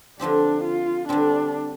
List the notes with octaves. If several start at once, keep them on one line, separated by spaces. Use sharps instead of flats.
D3 F3 C4 D4 G4
F4
D3 G3 C4 D4